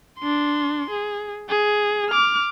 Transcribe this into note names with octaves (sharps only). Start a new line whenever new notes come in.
D4 C6
G#4
G#4
D6 F6